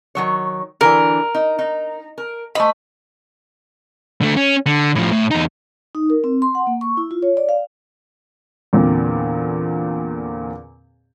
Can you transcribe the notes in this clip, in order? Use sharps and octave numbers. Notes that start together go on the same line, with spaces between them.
D#3 F#3 C#5
D3 E3 A#4
D#4
D#4
A#4
A3 C5 D#5 B5
D3 A3
C#4
D3
A2 F3
A2
E2 D#4
D#4
A#4
C4
C6
F#5
A#3
C#6
E4
F4
C#5
D5
F5
E2 A#2 D3 C4